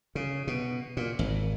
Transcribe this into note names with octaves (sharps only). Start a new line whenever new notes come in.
C#3
B2
A#2
G#1